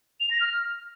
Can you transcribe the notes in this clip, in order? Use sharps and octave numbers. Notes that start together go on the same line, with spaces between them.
F7
A#6
F6